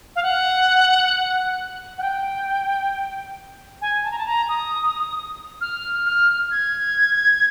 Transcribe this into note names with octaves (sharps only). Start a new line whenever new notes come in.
F5
F#5
F#5
G5
G#5
A5
A#5
A5
A#5
D#6
F6
F6
G#6